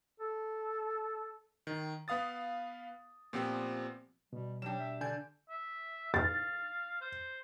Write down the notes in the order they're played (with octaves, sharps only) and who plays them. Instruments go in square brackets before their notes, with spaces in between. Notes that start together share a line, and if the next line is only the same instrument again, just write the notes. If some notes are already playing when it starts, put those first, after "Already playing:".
[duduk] A4
[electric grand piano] D#3
B3 B4 F5 D#6 A6
A#2 F3 B3 C4 G4
[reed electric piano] B2 [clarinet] G3
[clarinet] F#3 [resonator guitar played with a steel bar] G3 D4 [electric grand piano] G5 E7
[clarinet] E5
[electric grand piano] D3 G#5 G6 [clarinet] D5
[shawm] E5
[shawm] F5 [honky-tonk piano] A6
[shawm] C5